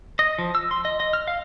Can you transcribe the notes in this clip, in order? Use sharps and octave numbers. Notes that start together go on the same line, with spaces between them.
D#5
F3
E6
C6
D#5
D#5
F6
F5